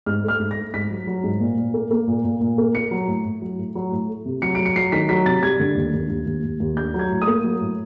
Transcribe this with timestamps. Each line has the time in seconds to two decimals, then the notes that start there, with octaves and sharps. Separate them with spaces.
0.06 G#2 F6
0.23 A3 F6
0.39 G#2
0.51 A#6
0.56 A3
0.74 G#2 B6
0.90 F#3
1.07 F#3
1.24 G#2
1.40 A#2
1.57 A#2
1.74 A#3
1.91 A#3
2.08 A#2
2.25 A#2
2.41 A#2
2.58 A#3
2.75 A#3 C#7
2.91 F#3
3.08 A2
3.25 A2
3.42 F#3
3.59 A2
3.75 F#3
3.92 A2
4.09 A3
4.26 C3
4.42 F#3 C#7
4.55 F#3 D7
4.66 C#7
4.76 F#3 C7
4.92 D#3 B6
5.09 F#3 B6
5.26 C3 A6
5.43 G3 G#6
5.60 D3
5.76 D#2
5.93 D#2
6.10 D#2
6.26 D#2
6.43 D#2
6.60 D#2
6.77 D4 G6
6.94 F#3
6.99 G#6
7.10 A2
7.22 D#6
7.27 A#3
7.44 F#3
7.61 A2